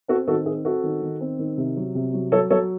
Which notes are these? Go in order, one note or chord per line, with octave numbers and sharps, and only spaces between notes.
C4 F#4 A4
D#3 F#4 A4
C4 G#4
C4 F#4 A4
D#3
D#3
C4
D#3
C3
F#3
C3
F#3
F#3 A4 C#5
F#3 A4 C#5